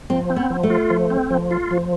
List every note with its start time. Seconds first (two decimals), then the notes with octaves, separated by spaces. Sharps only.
0.10 F3 C4
0.30 C4
0.36 B3
0.50 F3
0.63 A3
0.70 F4
0.90 F3
1.10 C4
1.31 F3
1.51 F4
1.71 F3